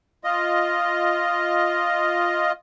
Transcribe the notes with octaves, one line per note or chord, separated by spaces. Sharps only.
F4 D#5